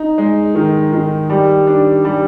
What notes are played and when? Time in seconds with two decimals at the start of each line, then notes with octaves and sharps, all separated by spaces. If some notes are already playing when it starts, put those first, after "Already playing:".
Already playing: D#4
0.18 G#3
0.55 D#3
0.93 D#3
1.30 G3
1.67 D4
2.05 G3